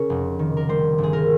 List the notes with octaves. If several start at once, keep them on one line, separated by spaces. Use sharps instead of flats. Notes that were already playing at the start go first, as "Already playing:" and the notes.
Already playing: C#3 G#4 A#4 C#5
F1
D#3
A#4
G3 C5
G1
G#4
A#4